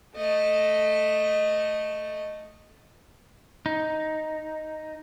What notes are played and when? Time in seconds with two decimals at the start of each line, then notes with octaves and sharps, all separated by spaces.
0.16 A3 D#5
3.66 D#4